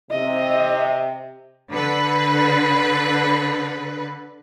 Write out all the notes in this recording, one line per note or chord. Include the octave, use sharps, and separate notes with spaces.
C3 D#5 E5
D3 B4